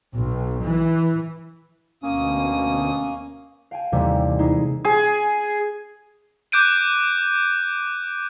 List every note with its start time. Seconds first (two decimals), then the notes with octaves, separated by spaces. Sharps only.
0.16 B1
0.65 E3
2.03 D2 B2 A#3 C#4 D#6
3.71 F5 G5 G#5
3.92 A1 D#2 C3 G3 A#3
4.39 G#3 D#4 E4 G#4
4.85 G#4
6.52 D6 F#6 G6 D7 D#7